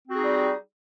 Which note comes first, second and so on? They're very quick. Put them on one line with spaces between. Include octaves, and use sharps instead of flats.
C4 F#4 G#4 D#4 G3